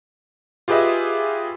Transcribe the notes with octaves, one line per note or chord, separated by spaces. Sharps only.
F4 G4 G#4 B4 D#5 E5